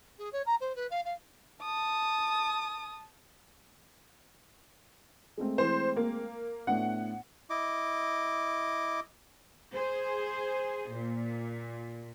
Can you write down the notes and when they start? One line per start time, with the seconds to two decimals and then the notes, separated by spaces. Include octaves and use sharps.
0.18 G#4
0.32 C#5
0.46 A#5
0.61 C5
0.76 B4
0.91 F5
1.05 F5
1.62 A5 D#6
5.38 G#3 A3 C4
5.58 E3 C5
5.96 A#3
6.67 A2 B3 D4 F#5
7.50 E4 D#5 D6
9.73 G#4 C5
10.92 A#2